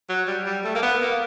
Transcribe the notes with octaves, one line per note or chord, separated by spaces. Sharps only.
F#3
G3
G3
A3
A#3
B3
A#3